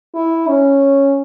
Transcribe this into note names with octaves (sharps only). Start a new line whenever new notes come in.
E4
C#4